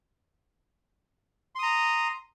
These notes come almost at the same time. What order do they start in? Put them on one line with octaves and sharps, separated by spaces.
C6 D#6 A#5